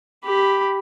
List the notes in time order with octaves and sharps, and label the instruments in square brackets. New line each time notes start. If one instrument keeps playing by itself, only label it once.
[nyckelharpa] G4 B5